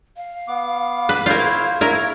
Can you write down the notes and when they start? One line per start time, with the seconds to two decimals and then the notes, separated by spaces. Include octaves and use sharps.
0.17 F5
0.48 B3 D6
1.09 B4
1.26 E4 F4 A#4 C5 C#5
1.81 E4 A#4 C#5